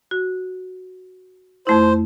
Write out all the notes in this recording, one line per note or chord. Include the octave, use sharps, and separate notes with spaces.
F#4
F2 A3 E4 C5